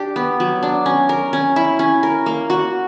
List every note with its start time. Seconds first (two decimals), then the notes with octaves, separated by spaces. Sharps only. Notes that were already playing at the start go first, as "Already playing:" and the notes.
Already playing: D4 G4
0.16 B3
0.40 F#3
0.63 D4
0.86 C#4
1.09 A#4
1.33 C#4
1.56 E4
1.79 C#4
2.03 A#4
2.26 A#3
2.50 F#4